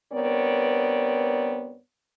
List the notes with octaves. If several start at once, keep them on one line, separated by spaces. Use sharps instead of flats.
G2 B3 C4 A#4 C#5 D5